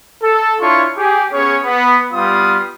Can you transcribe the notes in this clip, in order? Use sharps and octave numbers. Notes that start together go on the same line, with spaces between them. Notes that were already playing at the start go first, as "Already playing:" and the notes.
A4
D4 E4 F4 C#5 C#6
G4 G#4
B3 C#4 G#4 C#5
B3
G3 B3 F4 F5 D#6